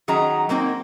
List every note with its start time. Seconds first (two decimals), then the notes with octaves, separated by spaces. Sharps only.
0.08 D#3 F#3 C#4 G#4 D#5 A#5
0.49 F#3 A#3 C4 D#4